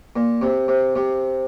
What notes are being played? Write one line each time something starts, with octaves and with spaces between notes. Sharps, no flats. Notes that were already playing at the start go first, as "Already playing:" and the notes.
A#2
C3
C3
C3